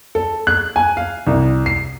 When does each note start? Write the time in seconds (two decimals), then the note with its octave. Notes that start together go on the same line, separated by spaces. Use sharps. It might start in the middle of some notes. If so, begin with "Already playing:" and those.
0.15 A4
0.47 F#6
0.76 G#5
0.97 F5
1.27 C2
1.66 C7